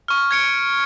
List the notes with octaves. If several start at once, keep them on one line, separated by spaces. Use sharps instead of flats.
C#6 F6
G#6 C#7 D7